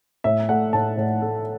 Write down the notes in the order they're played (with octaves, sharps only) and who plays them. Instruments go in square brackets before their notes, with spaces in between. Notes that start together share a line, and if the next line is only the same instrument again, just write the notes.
[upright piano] A2 E5
A3 F#5
A2 A5
A2
A3